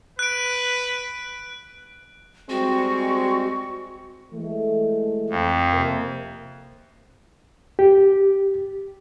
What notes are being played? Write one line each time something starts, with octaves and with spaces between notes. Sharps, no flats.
B4 F#6 D7
G3 G#3 C4 F#4 C#6
E3 G#3 A3
F2
C3 A#3
G4